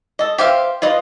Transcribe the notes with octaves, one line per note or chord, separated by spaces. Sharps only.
A4 D#5
G4 C5 E5 F5
F4 B4 D#5